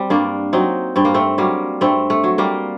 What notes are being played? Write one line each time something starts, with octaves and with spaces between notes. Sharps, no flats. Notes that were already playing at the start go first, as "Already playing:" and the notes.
Already playing: G3 C4
G2 A#3 D4
F#3 C4 D#4
G2 C4
A#3
A3 C4
F#3 G3 A#3
G2 A3 C4
A3
F#3
G3 A#3